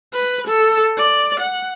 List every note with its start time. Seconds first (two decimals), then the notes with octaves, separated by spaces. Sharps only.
0.13 B4
0.47 A4
0.98 D5
1.40 F#5